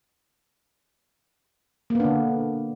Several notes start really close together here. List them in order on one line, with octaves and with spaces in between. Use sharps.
A#3 B3 D4 D3